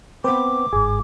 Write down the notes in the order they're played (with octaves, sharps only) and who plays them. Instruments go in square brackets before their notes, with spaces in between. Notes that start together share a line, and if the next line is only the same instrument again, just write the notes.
[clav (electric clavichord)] B3 C4 [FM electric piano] B4 [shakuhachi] D6
[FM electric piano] G1 G#2 [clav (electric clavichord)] G#4